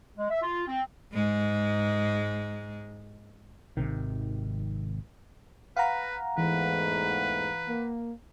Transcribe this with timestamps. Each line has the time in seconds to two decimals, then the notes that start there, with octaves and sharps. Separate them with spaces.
0.17 G#3
0.29 E5
0.42 F4
0.67 C4
1.13 G#2 G#3
3.77 G#1 C#2 C3 D#3
5.77 B4 F5 F#5 A#5
6.38 E2 G#2 E3 A3 B4
7.68 A#3